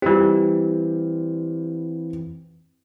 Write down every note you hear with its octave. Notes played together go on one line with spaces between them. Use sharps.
E3 G3 C4 F4 G4